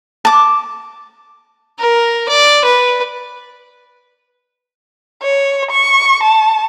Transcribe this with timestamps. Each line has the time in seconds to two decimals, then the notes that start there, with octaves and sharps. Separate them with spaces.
0.25 A5 D6
1.79 A#4
2.29 D5
2.64 B4
5.22 C#5
5.70 C#6
6.22 A5